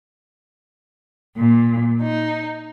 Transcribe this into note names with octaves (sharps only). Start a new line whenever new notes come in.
A#2
D#4